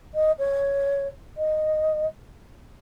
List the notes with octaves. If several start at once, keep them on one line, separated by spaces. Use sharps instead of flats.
D#5
C#5
D#5